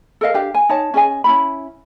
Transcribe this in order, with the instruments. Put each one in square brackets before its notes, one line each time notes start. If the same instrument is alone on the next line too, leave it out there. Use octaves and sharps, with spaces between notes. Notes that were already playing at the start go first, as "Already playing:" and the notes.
[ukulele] A4 A#4 D#5 F5
D4 G4 F5
G#5
D#4 C#5 A5
C#4 G#4 D#5 G#5
C#4 E4 B5